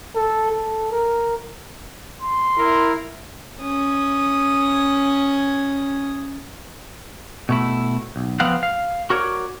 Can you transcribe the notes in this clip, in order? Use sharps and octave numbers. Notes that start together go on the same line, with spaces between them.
A4
A4
A#4
C6
E4 A#4
C#4 D#6
B2 A3 E4
B1
F3 B3 C4 F5 F#5
F5
F#4 A#4 C#5 D5